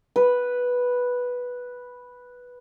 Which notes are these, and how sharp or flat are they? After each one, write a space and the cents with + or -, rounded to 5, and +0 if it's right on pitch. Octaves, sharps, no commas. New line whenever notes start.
B4 -5